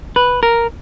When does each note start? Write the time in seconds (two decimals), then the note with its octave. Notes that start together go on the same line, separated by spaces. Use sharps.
0.16 B4
0.43 A#4